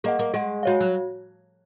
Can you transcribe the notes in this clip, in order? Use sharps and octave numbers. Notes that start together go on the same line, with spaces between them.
A#3 G#4 D#5 F#5
A#3
G#3 G#4 D#5 F#5
G#3 F#4 C#5 F5
F#3